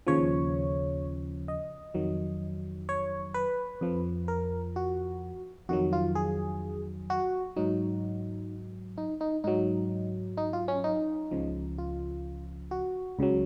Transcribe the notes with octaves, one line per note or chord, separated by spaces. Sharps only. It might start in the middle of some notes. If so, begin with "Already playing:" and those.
D#2 C#3 F3 C#5
D#5
F2 D#3 F#3
C#5
B4
F2 F3
A#4
F#4
F2 D#3 F#3 F#4
F4
G#4
F#4
G#2 F#3 D#4
D#4
D#4
G#2 F#3 D#4
D#4
F4
C#4
D#4
C#2 C#3 F3
F4
F#4
C#2 C#3 F#3